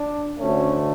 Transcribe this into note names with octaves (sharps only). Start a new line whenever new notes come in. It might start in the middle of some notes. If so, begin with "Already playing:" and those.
Already playing: D4
D2 D3 A3 C#4